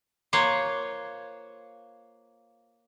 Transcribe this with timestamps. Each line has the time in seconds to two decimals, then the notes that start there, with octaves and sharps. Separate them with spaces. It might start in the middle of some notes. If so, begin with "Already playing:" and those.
0.33 A#3 F4 C5 C#5 F#5